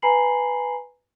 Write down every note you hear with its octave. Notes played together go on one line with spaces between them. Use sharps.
B4 G#5 A#5 B5 C7 F#7